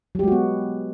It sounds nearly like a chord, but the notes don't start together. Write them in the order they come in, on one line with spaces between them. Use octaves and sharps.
F#3 G4 G#3 F#4 B3